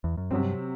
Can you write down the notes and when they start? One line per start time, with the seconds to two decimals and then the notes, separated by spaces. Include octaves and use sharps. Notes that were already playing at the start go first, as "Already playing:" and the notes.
0.04 E2
0.17 F#2
0.31 G2 C3 F#3 C4